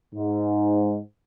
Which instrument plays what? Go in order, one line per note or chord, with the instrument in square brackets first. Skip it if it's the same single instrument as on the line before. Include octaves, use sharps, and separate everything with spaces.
[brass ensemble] G#2